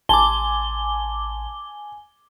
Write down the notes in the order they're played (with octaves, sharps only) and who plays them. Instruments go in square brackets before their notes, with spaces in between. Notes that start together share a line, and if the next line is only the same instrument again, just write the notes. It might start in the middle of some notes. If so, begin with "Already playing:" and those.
[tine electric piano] A1 C6 [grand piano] G#5 [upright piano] A5 [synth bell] D6 G7